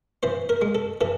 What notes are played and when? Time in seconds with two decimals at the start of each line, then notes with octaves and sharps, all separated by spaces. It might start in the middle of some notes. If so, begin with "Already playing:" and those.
0.23 E3 C5
0.49 A#4
0.62 G#3
0.75 A4
1.01 E3 A4